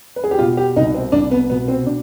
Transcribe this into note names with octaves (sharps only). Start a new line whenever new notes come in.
B4
G#4
G4
B2 F4
G4
C2 D#4
C4
C2 D4
B3
B2 B3
C4
D4